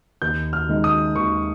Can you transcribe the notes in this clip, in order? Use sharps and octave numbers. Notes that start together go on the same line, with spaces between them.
D#2 G6
F6
D#3 G#3 D#4
D#6
D#2 C#6